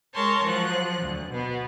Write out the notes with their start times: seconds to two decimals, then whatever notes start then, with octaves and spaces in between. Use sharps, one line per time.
0.15 G#3 A#4 C#5 A5 C6
0.45 F3 F#3 F#6
1.03 D2
1.32 B2 B3